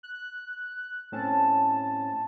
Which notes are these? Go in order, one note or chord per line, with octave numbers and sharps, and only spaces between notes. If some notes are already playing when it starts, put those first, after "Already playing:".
F#6
A2 C4 C#4 A5